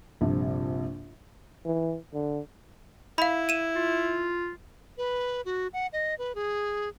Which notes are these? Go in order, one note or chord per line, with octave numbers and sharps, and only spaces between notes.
A#1 G2 C3
E3
D3
E4 F5 B5
D#7 E7
F4
B4
F#4
F#5
D#5
B4
G#4